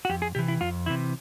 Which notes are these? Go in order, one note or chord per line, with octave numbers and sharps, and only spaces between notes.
F#4
F2 G4
G#4
C3 E3 G4
E4
F2 F4
C3 E3 E4